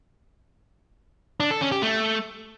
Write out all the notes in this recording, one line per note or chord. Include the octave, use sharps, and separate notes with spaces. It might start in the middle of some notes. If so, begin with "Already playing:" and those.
D4
A4
C#4
G4
A3